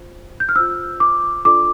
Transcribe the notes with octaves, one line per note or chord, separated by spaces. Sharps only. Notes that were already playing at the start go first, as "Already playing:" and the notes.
Already playing: F4 C5
G6
F6
F4 C5 E6
D6
D4 F4 A4 D5 D6